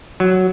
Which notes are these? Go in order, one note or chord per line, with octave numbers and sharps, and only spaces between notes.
F#3